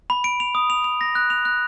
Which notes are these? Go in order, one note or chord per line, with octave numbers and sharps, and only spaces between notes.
B5
D7
F7
D#6
F7
F7
A#6
F#6
F7
F#6